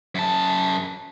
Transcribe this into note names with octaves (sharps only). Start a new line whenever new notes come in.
F#2 A5